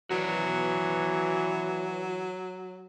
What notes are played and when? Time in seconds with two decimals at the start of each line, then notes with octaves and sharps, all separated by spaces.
0.11 E3 F#3 F#4 B4 D5